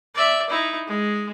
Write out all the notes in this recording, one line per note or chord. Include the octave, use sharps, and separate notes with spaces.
D5 E5
D#4 E4
G#3